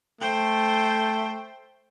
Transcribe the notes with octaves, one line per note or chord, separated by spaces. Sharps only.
A3 C5 G5